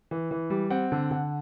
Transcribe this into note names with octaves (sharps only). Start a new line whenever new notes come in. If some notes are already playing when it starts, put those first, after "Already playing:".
E3
E3
G3
C4 F#5
D3
D3 F#5